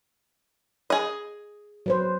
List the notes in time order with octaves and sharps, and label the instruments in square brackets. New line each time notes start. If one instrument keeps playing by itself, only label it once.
[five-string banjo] G#4 D#5
[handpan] F#3 B4 C5